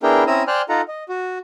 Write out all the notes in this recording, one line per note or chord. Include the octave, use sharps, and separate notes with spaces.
B3 D4 E4 G#4 A#4 G5
C4 C#4 E4 A#5 D#6 E6
C5 D5 G5 G#5 F6 F#6
D#4 F4 A4 F#5 A#5
D#5
F#4